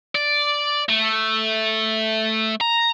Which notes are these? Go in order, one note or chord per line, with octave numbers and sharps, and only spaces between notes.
D5
A3
A#5